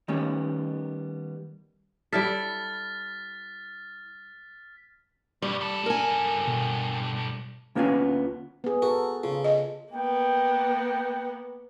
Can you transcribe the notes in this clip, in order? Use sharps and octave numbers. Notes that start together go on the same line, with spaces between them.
D#3 G3 A3 B3 C#4
G3 E4 A4 F6 A6 B6
G2 B2 G3
G2 A4
A#4 G#5
B2
D2 A#3 B3 C#4 F4 G#5
B3 G#4
F#4 A4 A#4
C#3 F4
D#5
A#3 B3 G5